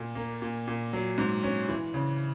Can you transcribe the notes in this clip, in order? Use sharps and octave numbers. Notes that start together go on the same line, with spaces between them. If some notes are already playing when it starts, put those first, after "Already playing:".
Already playing: A#2
A#3
A#2
A#2
F#3
G#2
C#4
E3
C#3